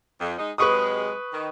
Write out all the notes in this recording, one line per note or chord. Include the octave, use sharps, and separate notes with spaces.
F2
G#3 D#4
C3 F#3 G#3 B4 C#6 D#6
D#3